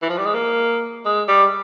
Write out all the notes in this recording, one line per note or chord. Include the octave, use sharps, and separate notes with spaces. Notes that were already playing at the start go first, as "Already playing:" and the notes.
E3
F3
G3
G#3
A#3
G#3
G3